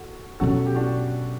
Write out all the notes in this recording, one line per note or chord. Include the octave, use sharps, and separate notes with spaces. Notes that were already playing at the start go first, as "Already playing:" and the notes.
Already playing: F#4 A4
B2 F#3 C#4 F#4 A4
G4
D4 F#4